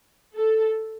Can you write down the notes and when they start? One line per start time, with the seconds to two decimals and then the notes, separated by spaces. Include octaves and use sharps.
0.34 A4